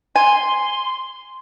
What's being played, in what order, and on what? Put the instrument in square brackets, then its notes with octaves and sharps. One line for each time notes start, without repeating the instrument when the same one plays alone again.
[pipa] G#5 [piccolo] C6